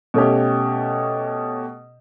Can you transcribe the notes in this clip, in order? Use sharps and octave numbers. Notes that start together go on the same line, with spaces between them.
B2 A3 C#4 G4